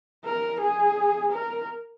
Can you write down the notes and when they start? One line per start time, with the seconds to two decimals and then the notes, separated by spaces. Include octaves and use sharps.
0.25 A#4
0.60 G#4
1.32 A#4